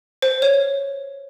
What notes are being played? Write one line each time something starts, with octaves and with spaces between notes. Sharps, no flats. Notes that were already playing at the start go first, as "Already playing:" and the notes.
C5
C#5